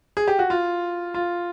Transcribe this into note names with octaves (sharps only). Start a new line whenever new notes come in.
G#4
G4
F#4
F4
F4